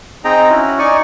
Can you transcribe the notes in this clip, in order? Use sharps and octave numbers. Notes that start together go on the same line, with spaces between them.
C4 D#4 G#4 D#5 G5 A#5
C#4 E4 F#4
D#4 D5 G#5 C#6